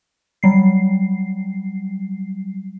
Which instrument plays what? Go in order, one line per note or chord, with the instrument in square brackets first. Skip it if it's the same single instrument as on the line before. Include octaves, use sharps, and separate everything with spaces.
[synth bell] F#3 G3 C7